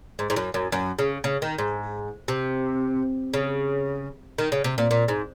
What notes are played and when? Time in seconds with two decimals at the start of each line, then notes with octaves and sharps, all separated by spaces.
0.19 G#2
0.30 G#2
0.36 F#2
0.54 F#2
0.72 F#2
0.99 C#3
1.24 C#3
1.42 D#3
1.58 G#2
2.28 C3
3.34 C#3
4.38 D#3
4.52 C#3
4.64 C3
4.78 A#2
4.91 A#2
5.08 G#2